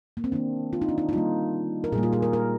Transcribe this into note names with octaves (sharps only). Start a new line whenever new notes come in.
A#3
C4
D#3 A#3 D4
F4
D#4
D4
D#4
D#4
D#3 G3 A#3 F4
A#4
A#2 G3 A#3 G#4
F4
G#4
A#4
A#4